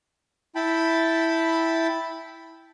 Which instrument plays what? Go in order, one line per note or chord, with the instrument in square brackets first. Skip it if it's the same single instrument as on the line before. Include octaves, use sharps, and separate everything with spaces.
[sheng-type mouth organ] E4 G5 A5 B5